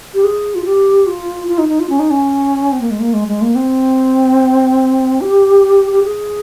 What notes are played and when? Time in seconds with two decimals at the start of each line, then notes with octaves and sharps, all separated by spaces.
0.14 G4
0.24 G#4
0.55 F4
0.65 G4
1.07 F4
1.48 F4
1.58 D#4
1.69 D#4
1.80 F4
1.89 C#4
1.99 D#4
2.10 C#4
2.72 C4
2.81 A#3
2.91 G#3
3.00 A#3
3.14 G#3
3.28 G#3
3.42 A#3
3.55 C4
5.21 G4
5.92 G4
6.04 G#4